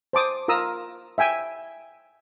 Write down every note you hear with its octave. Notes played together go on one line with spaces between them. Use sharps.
C5 A5 D6 D#6
F4 A#4 A#5 D#6 E6
E5 G5 G#5 E6